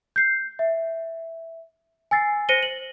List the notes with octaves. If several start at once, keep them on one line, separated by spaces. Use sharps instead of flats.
G6 C7
E5
G#5 E6 A6 C7
C5 A#6 C#7 D#7 G7
F#7